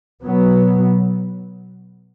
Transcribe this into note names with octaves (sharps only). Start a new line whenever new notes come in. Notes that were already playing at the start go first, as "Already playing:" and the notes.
B2 F#3 B3